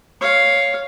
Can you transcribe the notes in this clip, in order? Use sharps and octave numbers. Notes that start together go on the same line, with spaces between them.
C#5 F5